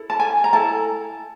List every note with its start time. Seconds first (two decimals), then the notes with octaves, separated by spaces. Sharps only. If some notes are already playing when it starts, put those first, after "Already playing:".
Already playing: E4 A4
0.10 A5
0.20 G#5
0.44 A#5
0.53 E4 A4 A5